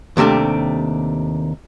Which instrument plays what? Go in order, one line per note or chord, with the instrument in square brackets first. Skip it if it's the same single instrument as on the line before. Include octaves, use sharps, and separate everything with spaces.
[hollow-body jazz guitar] D#2 C3 G3 A3 D4